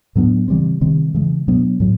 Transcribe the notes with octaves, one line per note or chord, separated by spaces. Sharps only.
A2 F#3 B3 D4
C#3 E3 G3 C4
C3 D#3 G3 C4
C#3 E3 G#3
B2 F#3 B3 D4
A2 F#3